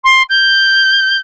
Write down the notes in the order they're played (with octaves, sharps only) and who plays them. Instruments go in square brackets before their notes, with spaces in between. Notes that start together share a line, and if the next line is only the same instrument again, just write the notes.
[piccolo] C6
G6